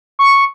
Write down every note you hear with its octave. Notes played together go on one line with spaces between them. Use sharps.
C#6